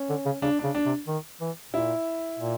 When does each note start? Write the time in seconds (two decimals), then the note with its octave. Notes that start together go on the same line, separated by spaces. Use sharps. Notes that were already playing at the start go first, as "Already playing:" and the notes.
Already playing: C#4
0.10 D3
0.26 C#3
0.42 C#3 D4
0.59 C#3 D4
0.75 D4
0.86 C3
1.07 D#3
1.41 E3
1.73 A#2 E4
2.39 A#2